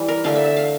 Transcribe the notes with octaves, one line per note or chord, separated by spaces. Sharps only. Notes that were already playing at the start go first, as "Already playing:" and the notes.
Already playing: E3 G3
A#4
D3 A3 F5
E5
E5
F5